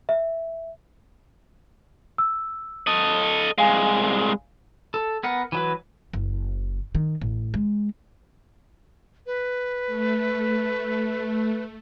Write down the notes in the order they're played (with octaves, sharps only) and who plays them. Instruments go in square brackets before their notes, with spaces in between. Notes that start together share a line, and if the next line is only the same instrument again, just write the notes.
[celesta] E5
E6
[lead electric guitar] A4 D#5
[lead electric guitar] C2 G#3 [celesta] F5 G#5
[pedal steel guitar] A4
B3 A#4 F#5
E3 F#3 B4
[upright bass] F#1
D#3
A1
G#3
[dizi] B4
[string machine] A3